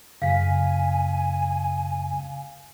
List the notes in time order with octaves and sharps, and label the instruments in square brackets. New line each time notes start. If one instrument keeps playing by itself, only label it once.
[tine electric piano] F#2 C#3 B6 [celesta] F5 [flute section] G#5